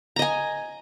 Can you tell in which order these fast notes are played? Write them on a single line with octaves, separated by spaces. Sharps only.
A#5 D#5 G#5